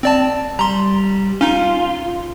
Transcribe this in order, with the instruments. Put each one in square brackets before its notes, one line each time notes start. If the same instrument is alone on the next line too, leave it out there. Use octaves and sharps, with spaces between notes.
[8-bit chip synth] C4 D5 A5
[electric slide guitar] G3 [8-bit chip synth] A#5 C6
[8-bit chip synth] C#4 D#4 [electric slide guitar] F4